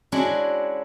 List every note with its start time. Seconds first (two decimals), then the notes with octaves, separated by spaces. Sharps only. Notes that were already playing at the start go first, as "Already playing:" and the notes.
0.12 G#3 C#4 D4 E4 F#4